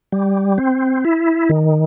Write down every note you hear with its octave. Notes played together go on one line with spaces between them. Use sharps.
G3
C4
E4
D#3